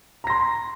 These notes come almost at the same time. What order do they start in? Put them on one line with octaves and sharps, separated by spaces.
A#5 A#6 C6